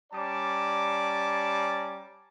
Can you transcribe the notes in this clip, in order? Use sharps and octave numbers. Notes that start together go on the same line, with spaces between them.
G3 C#4 D5 A5 A#5 D6